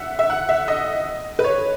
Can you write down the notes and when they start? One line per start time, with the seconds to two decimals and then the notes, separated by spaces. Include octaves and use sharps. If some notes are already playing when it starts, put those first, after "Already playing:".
Already playing: E5 F#5
0.19 E5
0.30 F#5
0.49 E5
0.68 D#5
1.39 B4
1.44 C#5